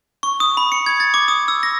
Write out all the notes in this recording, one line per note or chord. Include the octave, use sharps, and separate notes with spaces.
C#6
D#6
B5
C#7
G#6
A6
D6
D#6
E6
A#6